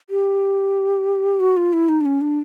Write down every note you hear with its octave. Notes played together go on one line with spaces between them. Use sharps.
G4
F#4
F4
E4
D#4
D4
C#4
D4